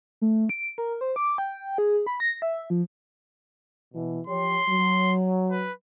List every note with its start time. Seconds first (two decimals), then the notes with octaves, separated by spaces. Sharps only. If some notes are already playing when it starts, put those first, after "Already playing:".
0.22 A3
0.49 D7
0.78 A#4
1.01 C5
1.16 D6
1.38 G5
1.78 G#4
2.07 B5
2.20 A#6
2.42 E5
2.70 F3
3.94 B2 E3
4.27 F3 G4 C#5 C6
4.68 F#3
5.50 B4